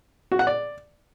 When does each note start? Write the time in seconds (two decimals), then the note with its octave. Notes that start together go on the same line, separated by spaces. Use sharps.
0.32 F#4
0.39 F#5
0.47 D5